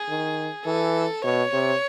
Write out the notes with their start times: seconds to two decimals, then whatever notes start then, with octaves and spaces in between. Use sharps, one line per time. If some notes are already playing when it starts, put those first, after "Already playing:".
Already playing: G#4
0.09 D#3
0.66 E3 A4
1.24 B2 C#5
1.53 C3